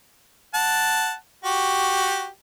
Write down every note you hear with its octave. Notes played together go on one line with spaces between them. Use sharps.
F#5 A5
F#4 G4